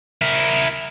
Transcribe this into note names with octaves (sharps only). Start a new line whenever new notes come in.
E4 A#4